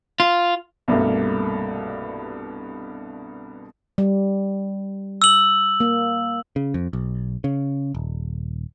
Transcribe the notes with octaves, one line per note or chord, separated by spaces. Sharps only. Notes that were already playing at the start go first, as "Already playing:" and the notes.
F4
C2 G2 B2 A3 A#3
G3
E6 F#7
A#3
C#3
F2
B1
C#3
D#1